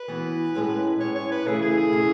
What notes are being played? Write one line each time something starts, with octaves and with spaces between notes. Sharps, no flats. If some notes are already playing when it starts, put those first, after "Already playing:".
Already playing: B4
E3 B3 F#4
A2 G#3 C#4
A2 G#3 C#4 C#5
C#5
B4
C#3 E3 A3 E4 G#4
G#4
G#4
C#3 E3 A3 E4